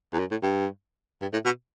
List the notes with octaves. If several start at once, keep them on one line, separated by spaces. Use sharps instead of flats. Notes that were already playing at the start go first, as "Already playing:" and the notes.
E2
F#2
A2
G2
G2
A2
B2